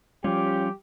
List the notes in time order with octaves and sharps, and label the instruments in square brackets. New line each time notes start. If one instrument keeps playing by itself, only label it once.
[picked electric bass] F3 G3 [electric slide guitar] C#4 F4 [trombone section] G4